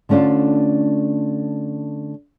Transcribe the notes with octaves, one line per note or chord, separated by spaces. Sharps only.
D3 A3 C#4 D4 F4